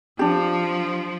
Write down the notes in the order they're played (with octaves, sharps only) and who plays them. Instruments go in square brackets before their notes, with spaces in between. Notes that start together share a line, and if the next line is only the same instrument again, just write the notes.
[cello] F3 [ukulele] D4 G4